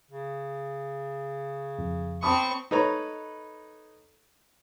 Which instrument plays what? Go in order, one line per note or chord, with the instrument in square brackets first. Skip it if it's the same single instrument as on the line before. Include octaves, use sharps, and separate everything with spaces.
[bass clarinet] C#3
[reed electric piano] F2
[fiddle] C4 C#6 [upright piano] A5 B5 D#6
[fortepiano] D#4 A4 B4 C#5 A#5